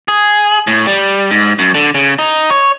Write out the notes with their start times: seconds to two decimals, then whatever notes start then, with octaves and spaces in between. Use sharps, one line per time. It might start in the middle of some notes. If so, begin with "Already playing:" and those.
0.08 G#4
0.67 A2
0.87 G3
1.31 G#2
1.59 F#2
1.74 D3
1.95 C#3
2.19 D#4
2.50 C#5